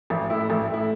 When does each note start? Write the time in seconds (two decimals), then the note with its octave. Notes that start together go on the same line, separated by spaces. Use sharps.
0.10 A1
0.30 A2 A3 E4
0.50 A1
0.69 A2 A3 E4